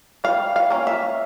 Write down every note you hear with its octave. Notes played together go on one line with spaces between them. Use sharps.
G3 F5
F5
A#3 C#4
E5